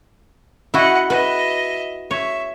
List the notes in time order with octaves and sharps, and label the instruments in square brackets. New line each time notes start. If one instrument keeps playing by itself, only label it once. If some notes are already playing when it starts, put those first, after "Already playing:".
[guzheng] E4 F#4 [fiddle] D#5 F#5
[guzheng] B4 [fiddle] D#5 E5
[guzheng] C#5 [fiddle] E5